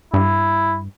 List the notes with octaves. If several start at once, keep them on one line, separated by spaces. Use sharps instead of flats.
G2 E4